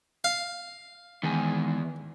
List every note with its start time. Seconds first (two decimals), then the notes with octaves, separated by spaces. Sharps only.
0.24 F5
1.23 E2 D#3 G#3 G#5